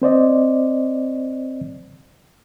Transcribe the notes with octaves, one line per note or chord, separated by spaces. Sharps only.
C4 C5 D5 D#5